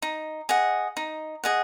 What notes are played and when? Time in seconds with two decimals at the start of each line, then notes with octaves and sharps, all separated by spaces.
0.02 D#4
0.49 G#4 D#5 F#5
0.97 D#4
1.44 G#4 D#5 F#5